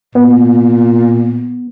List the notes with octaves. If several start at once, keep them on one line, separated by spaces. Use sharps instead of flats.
A#2 B3